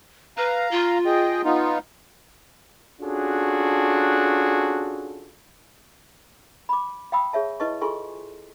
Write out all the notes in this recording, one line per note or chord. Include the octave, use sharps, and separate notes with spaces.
B4 F5 A#5
F4
G#4 D#5 G5
B3 D#4 F4
C#4 D4 F4 F#4 G#4 A4
B5 D6
F5 G5 B5 D#6 E6
G#4 C#5 E5 A5
E4 B4 D#5 A5 C#6
F4 G#4 A4 G#5 C6 C#6